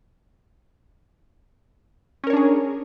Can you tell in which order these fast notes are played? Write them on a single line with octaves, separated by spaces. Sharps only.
C#4 A#4 C#5 D4 G#4